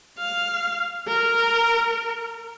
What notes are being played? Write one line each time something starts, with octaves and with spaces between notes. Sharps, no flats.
F5
A#4